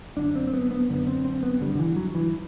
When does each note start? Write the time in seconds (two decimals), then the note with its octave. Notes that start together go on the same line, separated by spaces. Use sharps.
0.17 F#2 D3 D4
0.36 C4
0.47 C4
0.54 B3
0.71 B3
0.89 F#2 D3 B3
1.07 C4
1.25 C4
1.43 B3
1.61 G2 D3 G3
1.75 D3
1.79 E3
1.96 F#3
2.15 E3